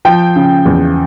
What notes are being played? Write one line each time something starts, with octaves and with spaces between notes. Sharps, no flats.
F3 G5
C#3
E2